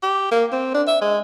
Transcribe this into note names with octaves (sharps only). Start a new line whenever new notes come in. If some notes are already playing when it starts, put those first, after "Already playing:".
G4
A#3
C4
D4
E5
G#3